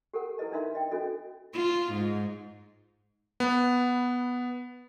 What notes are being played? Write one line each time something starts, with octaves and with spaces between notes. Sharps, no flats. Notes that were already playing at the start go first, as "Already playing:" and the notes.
G4 A4 A#4 F#5
E4 A4 B4 D#5 A5
D4 D#4 A#4 E5 F5 C6
D#5 G5
C#4 D4 F#4 A4 D#5
F4
G#2
B3